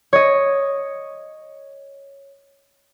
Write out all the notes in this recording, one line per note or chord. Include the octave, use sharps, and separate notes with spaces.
C#5 D#5